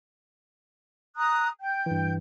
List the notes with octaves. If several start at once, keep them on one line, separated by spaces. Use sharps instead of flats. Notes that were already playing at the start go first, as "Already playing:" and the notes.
A#5 D#6 F#6
G5 G6
G2 E3